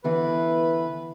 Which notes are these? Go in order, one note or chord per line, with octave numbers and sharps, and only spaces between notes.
D3 E3 B3 B4